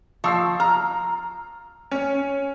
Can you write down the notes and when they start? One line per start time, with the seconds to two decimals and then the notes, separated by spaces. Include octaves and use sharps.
0.24 F3 C#6 E6 C7
0.60 A#5 F6
1.91 C#4